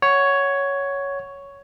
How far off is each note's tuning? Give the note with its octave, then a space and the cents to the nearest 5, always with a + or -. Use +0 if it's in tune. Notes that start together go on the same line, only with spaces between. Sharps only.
C#5 +5 F#5 +0